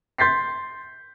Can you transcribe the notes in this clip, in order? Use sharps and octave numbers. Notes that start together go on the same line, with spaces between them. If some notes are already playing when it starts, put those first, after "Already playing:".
C6 G6 A6 B6 C7